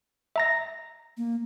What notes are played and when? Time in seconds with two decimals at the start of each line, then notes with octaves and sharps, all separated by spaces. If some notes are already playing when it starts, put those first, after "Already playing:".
0.36 E5 A#5 A#6
1.17 A#3